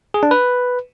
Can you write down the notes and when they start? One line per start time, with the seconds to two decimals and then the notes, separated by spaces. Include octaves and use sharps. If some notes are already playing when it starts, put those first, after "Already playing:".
0.14 G#4
0.23 D4
0.31 B4